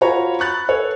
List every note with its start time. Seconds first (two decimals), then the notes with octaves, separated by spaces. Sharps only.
0.01 F4 F#4 C5 C#5 A#5 B5
0.39 B5 C#6 F#6 A6
0.69 A4 B4 C#5